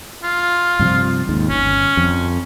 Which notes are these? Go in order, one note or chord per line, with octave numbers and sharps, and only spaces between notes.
F4
G2 C3 F3
D#2 G#2
G1 C#4
F2